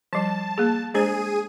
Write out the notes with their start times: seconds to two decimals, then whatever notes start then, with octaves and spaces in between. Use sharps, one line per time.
0.13 F3 G3 A5
0.58 A#3 G#4
0.94 G#3 D4 G#4 C5 D#7